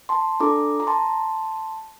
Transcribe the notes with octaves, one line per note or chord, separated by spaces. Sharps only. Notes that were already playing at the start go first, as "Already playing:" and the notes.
A5 C6
D4 F4 A4 A#5 D6
A#5
A5 C6